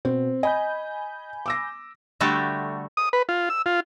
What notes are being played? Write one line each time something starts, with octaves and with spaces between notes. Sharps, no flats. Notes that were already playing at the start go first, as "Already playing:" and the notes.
B2 C4
D#5 G#5 B5 G6
D6 E6 A#6
D3 G3 A3 F#4 G4
D#6
B4
F4
E6
F4